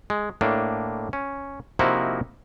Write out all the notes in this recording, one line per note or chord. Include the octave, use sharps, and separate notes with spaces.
G#3
A2 A#3 D4
C#4
C3 F3 A#3 D#4 E4 F#4